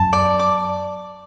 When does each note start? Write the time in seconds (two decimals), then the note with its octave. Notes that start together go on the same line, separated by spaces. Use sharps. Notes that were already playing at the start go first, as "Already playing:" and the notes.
Already playing: F#2 A5
0.13 D5
0.39 D6